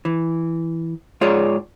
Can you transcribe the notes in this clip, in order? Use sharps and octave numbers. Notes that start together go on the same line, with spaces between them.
E3
G#2 F4 G#4 C#5 D5